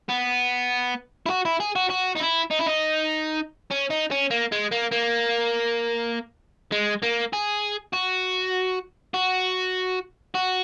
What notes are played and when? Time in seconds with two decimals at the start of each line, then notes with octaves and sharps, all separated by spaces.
0.09 B3
1.26 E4
1.30 F#4
1.45 E4
1.60 G#4
1.75 F#4
1.90 F#4
2.15 D#4
2.20 E4
2.51 D#4
2.59 E4
2.66 D#4
3.71 C#4
3.91 D#4
4.11 C#4
4.31 A#3
4.52 G#3
4.71 A#3
4.91 A#3
6.72 G#3
7.03 A#3
7.33 G#4
7.94 F#4
9.14 F#4
10.34 F#4